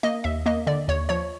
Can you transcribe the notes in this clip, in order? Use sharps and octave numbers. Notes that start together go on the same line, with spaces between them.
A#3 D#5
D#2 E5
A#3 D#5
D3 D5
D#2 C#5
F3 C#5